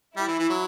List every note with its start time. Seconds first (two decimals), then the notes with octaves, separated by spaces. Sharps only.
0.16 G3 E4
0.27 E3
0.39 E3
0.49 F#3